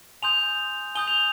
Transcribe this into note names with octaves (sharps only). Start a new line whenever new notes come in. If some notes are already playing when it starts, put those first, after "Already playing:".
G#5 C6 D#6 G6 F7
G#5 D#6 G6 G7
F7